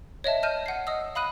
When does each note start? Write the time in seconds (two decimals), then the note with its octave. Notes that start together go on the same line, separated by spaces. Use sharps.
0.24 C#5 D#5 E5 A5
0.43 D#5 A5 F6 G6 D#7
0.66 F#5 C7
0.87 D#5 D#6 E6
1.15 F5 B5 D#6 F#6 D#7